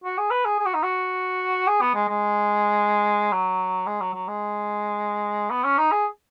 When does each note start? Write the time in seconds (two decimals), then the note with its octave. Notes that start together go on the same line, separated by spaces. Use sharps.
0.04 F#4
0.18 G#4
0.30 B4
0.45 G#4
0.59 G#4
0.66 F#4
0.74 D#4
0.83 F#4
1.67 G#4
1.81 B3
1.95 G#3
2.08 G#3
3.32 F#3
3.87 G#3
4.01 F#3
4.14 F#3
4.28 G#3
5.51 B3
5.64 C#4
5.78 D#4
5.91 G#4